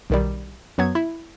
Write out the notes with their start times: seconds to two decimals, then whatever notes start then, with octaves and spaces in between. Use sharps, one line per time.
0.10 B1 D#3 G3
0.78 F#2 F#3 B3 G#6
0.95 E4